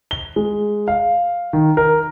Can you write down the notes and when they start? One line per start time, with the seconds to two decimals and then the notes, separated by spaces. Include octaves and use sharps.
0.11 G7
0.36 G#3
0.88 F5
1.53 D#3
1.77 A#4